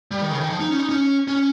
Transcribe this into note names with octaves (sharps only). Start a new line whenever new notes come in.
G3
D#3
C#3
D#3
F3
D#4
C#4
D#4
C#4
C#4